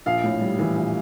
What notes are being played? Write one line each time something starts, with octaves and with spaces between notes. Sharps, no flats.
A#1 F5
A2
G3
E3
A#1